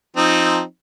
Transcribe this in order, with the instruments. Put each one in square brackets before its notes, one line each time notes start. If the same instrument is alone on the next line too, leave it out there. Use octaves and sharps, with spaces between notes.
[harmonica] F3 C4 D#4